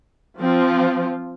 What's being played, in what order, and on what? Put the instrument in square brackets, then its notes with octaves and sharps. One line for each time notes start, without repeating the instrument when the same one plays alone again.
[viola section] F3 C4 F4